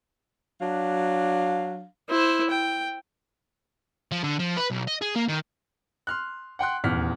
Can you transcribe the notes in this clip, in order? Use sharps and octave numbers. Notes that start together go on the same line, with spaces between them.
F#3 D4 F5
E4 C5
G5
F3
D3
F3
B4
B1
D#5
G#4
A#3
D#3
C6 F6 F#6
F#5 G5 C6 F#6
D#1 E2 F6 B6